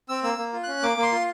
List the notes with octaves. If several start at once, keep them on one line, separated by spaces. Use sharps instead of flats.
C4 E6
A#3 E6
A#3
F4
C#4 F#6
A#3 D6
A#3
C6
F4